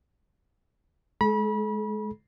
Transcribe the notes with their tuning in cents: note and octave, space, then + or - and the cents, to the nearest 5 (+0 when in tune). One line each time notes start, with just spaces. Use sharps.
G#3 +20 A4 -40 B5 -35